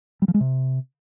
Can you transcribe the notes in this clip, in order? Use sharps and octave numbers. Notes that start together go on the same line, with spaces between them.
G3
F3
G#3
C3